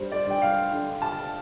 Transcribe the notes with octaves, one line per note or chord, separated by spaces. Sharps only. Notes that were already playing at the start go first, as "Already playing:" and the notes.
Already playing: G2 G3 C5
D5
G2 G5
F5
D3
A5